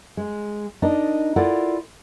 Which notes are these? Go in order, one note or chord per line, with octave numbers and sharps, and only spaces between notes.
G#3
D4 D#4 A#4 D5 D#5
E4 F4 A4 A#4 D5 F#5